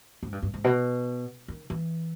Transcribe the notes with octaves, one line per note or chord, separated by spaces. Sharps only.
G#2
G2
G2
G#2
B2
D#3
E3